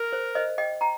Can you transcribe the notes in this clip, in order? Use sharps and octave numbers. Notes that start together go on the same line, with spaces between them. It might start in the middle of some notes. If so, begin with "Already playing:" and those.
Already playing: A#4
C5
C5 D#5
D#5 G5
G5 A#5